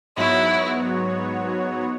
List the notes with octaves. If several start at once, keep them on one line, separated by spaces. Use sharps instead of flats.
G#2 F#3 B3 E4 F#4 C#5